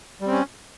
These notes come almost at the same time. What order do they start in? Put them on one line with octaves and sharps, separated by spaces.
G3 C4 C#4